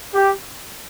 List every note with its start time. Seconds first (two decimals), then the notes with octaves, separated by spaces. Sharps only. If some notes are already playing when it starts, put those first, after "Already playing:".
0.14 G4